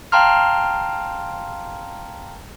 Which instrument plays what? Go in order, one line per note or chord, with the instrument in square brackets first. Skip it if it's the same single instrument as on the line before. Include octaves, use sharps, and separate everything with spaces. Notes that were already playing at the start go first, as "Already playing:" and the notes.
[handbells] F5 G5 A5 A#5 C6 F6